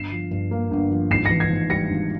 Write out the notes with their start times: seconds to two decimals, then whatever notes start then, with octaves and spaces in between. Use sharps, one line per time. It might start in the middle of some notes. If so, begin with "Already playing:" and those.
Already playing: G1 C7 E7
0.12 F3
0.31 G2
0.51 A#3
0.71 G1
0.91 F3
1.10 G#1 C7 E7
1.25 A#6 C#7
1.31 E3
1.40 G#6 C7
1.50 G#2
1.70 G3 A#6 C#7
1.91 G#1